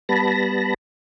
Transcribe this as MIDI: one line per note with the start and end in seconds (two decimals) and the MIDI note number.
0.09 0.74 55
0.09 0.74 59
0.09 0.74 81
0.09 0.74 83
0.09 0.74 94